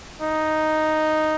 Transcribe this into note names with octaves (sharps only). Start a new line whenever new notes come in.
D#4